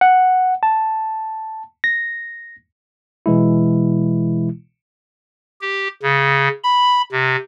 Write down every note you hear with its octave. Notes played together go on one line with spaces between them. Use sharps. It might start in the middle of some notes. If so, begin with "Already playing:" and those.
F#5
A5
A#6
B2 E3 G#3 E4
G4
C#3
B5
C3